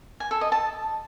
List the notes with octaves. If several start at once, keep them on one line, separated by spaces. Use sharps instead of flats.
G#5
A4
D#5
A5